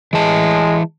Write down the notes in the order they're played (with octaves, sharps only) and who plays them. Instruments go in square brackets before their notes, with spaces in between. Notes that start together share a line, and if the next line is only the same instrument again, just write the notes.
[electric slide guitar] E3 A5 [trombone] G#3